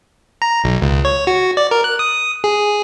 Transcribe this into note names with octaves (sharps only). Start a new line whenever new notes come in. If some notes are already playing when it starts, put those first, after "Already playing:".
A#5
B1
C#2
C#5
F#4
D5
A#4
F#6
D#6
G#4